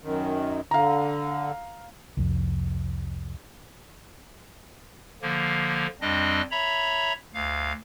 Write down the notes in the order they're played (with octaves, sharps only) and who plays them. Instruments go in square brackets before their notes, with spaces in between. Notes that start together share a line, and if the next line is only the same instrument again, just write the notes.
[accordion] F#2 D#3
[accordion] D3 [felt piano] F5 A#5
[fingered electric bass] C2 F2
[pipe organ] D3 F3 A#3
F2 G3 C4 D4 D#5
C#5 E5 A#5 B5
D2 F5